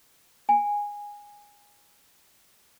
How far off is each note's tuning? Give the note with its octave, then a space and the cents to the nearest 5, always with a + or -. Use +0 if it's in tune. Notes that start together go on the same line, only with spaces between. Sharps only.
G#5 -10